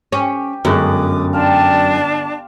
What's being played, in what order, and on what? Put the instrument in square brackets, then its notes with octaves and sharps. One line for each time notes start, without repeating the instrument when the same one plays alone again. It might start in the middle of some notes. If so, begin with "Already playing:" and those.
[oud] C#4 [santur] G4
[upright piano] G1 G#3 F#6 [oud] F#2 [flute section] D6 D#6
[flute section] D4 D5 A5 [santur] F5 G5 C6